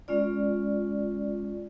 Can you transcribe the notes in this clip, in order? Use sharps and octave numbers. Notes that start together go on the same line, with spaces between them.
G#3 C#4 F4 D5